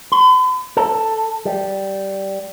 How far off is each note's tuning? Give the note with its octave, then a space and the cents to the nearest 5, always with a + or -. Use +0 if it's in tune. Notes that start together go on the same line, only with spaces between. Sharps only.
B5 +45
A4 +5
G3 -10